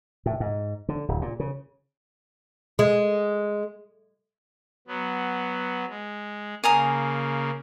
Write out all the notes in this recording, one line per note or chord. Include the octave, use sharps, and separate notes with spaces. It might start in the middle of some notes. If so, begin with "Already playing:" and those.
A2
G#2
D3
D1
A#2
C#3
G#3
F#3 B3
G#3
C#3 A#3 G#5 A#5 D#6